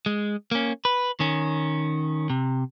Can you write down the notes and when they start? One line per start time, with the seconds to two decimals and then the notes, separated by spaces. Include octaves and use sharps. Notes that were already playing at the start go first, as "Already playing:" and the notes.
0.06 G#3
0.51 A#3 C#4
0.85 B4
1.20 D#3 C#4
2.30 C3